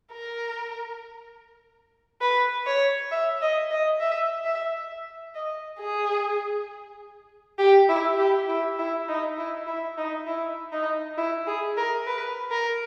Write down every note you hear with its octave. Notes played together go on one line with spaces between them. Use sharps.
A#4
B4
C#5
E5
D#5
D#5
E5
E5
D#5
G#4
G4
E4
G4
E4
E4
D#4
E4
E4
D#4
E4
D#4
E4
G#4
A#4
B4
A#4